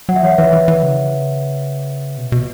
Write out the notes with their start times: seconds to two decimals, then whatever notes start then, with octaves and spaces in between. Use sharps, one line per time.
0.09 F#3 F#5
0.16 E5
0.23 E3 C#5 F#5
0.38 E3 B4 E5
0.53 E3
0.68 E3
0.83 C#3
2.17 B2
2.32 B2